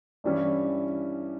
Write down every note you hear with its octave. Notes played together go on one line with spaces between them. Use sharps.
G2 E3 G3 C#4 E4